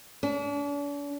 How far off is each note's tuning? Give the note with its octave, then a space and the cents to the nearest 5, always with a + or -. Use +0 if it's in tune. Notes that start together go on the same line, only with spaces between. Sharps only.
D4 -45